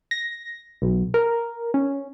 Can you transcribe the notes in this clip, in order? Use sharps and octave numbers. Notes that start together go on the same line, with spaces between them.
A#6
B1
A#4
C#4